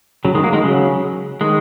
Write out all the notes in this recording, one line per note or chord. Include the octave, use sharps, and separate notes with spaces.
C#3 F#3
D#3 G#3
F#3 A#3
D#3 G#3
C#3 F#3
D#3 G#3